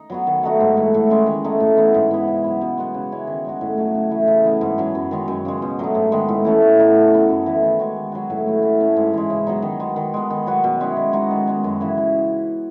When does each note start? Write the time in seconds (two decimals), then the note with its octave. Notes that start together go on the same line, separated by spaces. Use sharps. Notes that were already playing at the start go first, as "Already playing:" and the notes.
Already playing: D#4
0.10 F#3 B3 F#4
0.27 D#3
0.43 A3 D#4 F#4
0.60 G#2
0.77 E3 A3
0.94 A2
1.10 G#3 C#4
1.27 D#3
1.44 A3 D#4
1.60 A2
1.77 E3 B3
1.94 G#2
2.11 E3 B3
2.28 C#3
2.44 F#3 B3
2.61 B2
2.78 G#3 B3 F#4
2.94 C#3
3.12 G#3 C#4 E4
3.27 D#3
3.45 G#3 D#4 F#4
3.61 A2
3.78 F#3 A3
3.95 C#3
4.11 E3 A3 E4
4.28 C#3
4.44 E3 B3
4.61 G#2
4.78 F#3 C#4
4.95 F#2
5.11 D#3 G#3 C#4
5.28 F#2
5.45 C#3 G#3
5.62 B2
5.79 F#3 A3 D#4
5.95 G#2
6.12 D#3 G#3 B3
6.28 A2
6.45 E3 A3 C#4
6.62 E3
6.79 A3 D#4 F#4
6.95 C#3
7.12 F#3 B3
7.29 F#2
7.46 E3 A3
7.63 D#3
7.80 G#3 C#4 F#4
7.96 D#3
8.12 F#3 B3 F#4
8.30 A2
8.46 E3 A3
8.63 E3
8.80 A3 C#4
8.96 G#2
9.13 E3 G#3
9.30 C#3
9.47 F#3 B3 D#4
9.62 D#3
9.80 G#3 B3
9.96 D#3
10.14 G#3 B3
10.30 D#3
10.47 F#3 B3 F#4
10.64 B2
10.81 G#3 C#4 E4
10.96 D#3
11.13 G#3 D#4 F#4
11.31 D#3
11.47 G#3 B3
11.64 F#2
11.81 C#3 E3
11.97 E3